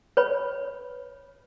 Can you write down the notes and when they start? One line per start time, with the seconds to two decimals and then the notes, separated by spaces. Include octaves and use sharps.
0.17 B4 C#5 B5